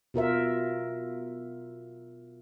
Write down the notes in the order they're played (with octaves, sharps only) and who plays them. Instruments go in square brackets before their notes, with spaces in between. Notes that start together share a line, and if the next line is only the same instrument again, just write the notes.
[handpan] B2 F4 A#4 E5